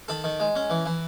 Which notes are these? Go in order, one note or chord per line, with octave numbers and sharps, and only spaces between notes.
D#3 A4
D#3
G#3
C#4
E3
E3